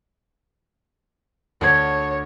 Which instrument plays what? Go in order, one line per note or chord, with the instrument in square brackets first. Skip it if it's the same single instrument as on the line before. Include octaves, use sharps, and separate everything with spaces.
[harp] D2 G#6 [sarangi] C#5